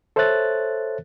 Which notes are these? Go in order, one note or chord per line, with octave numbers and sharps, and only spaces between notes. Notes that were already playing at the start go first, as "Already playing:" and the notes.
A4 C5 C#5 E5 F#6 A6